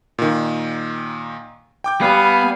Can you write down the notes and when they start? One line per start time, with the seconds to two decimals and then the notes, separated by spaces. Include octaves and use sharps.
0.18 A#2 D#3
1.84 G5 D6 G6
2.01 G3 B3 B4 F5 G#5